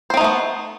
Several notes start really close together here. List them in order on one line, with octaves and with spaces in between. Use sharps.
C5 C4 D#4 A3 B3